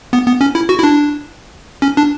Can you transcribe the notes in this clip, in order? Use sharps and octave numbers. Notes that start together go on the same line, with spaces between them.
B3
B3
C#4
E4
F#4
E4
D4
C#4
D4